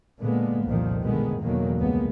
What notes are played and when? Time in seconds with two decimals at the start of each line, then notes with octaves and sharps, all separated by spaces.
0.21 A#2 D3 G#3 A#3 B3
0.66 C2 F2 A#2 D3 D#3 F3
1.01 B2 D3 D#3 G#3 A3 B3
1.41 E2 B2 D3 D#3 F#3 A#3
1.78 C#2 G2 G#3 A#3 B3